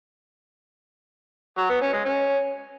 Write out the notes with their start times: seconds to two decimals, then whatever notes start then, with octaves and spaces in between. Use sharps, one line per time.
1.58 F#3
1.70 B3
1.81 C#4
1.93 G#3
2.05 C#4